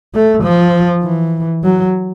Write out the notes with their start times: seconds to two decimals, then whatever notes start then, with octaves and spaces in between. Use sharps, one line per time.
0.14 A3
0.44 F3
1.03 E3
1.63 F#3